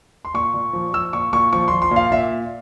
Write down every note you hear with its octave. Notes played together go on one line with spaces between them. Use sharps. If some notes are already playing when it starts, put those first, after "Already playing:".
C6
A#2 C#6
A#2
F3
F3 E6
A#2 C#6
A#2 C#6
F3 C#6
F3 C6
C6
A#2
F5
A#2 E5